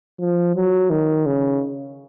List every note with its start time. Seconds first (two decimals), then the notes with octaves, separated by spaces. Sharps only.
0.20 F3
0.55 F#3
0.90 D#3
1.26 C#3